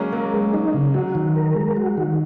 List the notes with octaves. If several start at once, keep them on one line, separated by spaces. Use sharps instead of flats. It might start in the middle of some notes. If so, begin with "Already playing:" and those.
Already playing: F#3 G#3 A#3 C#4
F#3 A#3 A#4
G#3
D#4
C#3
F#3 F#4
D#3
A#4
G#3
F#4
D#3